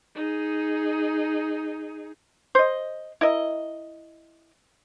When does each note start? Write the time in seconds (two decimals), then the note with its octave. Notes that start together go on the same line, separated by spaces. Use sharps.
0.15 D#4 G#4
2.55 C5 D#5
3.21 E4 A#4 D#5